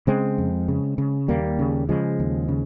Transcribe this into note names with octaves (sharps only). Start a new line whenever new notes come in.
C#3 G#3 C4
F2
C#3
C#3
D#2 G3 A#3
C#3
C#3 F3 G#3
D#2
C#3